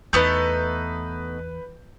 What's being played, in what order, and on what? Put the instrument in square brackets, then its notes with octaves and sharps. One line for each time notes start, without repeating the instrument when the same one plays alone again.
[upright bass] E2 [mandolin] A3 B3 D#4 [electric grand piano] B4 G6